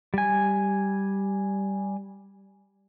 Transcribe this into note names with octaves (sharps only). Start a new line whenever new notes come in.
G3 G#5